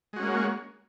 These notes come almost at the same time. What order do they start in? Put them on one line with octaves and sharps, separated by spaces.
G#3 F#4 C#4 A#3